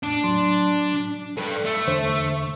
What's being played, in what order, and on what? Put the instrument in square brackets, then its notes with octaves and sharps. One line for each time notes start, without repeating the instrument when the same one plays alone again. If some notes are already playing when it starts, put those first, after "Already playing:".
[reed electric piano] E2 A2 [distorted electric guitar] D4
[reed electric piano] A2 F#3 C6
[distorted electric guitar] G2 [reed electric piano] A4
[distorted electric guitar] A3
[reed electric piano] E2 D3 C5